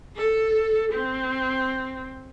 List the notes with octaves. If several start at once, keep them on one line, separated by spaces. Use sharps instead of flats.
A4
C4